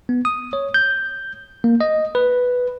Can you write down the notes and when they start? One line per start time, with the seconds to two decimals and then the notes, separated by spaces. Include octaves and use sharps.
0.09 B3
0.25 D#6
0.53 C#5
0.74 G6
1.64 A#3
1.81 D#5
2.15 B4